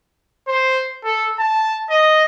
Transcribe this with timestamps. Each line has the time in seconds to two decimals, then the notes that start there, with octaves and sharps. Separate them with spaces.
0.48 C5
1.05 A4
1.39 A5
1.90 D#5